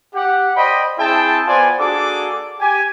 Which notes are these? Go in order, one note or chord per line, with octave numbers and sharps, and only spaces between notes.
G4 F#5
C5 D5 D#5 G5 B5
C4 E4 G#4 G5 A5
B3 F4 C5 D5 G#5
A#3 D4 F#4 G#4 A4 D6
G4 G#5